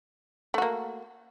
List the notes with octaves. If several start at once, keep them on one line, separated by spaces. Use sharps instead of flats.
A3 A#3 F#4